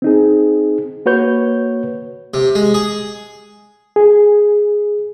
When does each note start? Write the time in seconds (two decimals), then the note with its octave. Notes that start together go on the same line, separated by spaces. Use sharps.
0.02 C4 D#4 G#4
1.06 A#3 F#4 B4 C#5 G6
2.34 C3
2.55 G#3
2.74 G#4
3.96 G#4